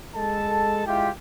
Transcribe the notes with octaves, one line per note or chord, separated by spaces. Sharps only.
G#3 A4 A5
G#3 E4 F4 G4